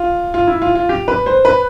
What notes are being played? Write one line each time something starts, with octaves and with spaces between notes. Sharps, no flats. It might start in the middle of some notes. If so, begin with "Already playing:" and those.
Already playing: F4
F4
E4
F4
F4
G4
B4
C5
B4